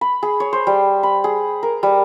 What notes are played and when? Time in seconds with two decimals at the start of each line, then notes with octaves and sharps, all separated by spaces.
0.01 B5
0.23 G#4
0.40 C#5
0.53 C5
0.67 G3
1.03 B5
1.24 G#4
1.63 A#4
1.83 G3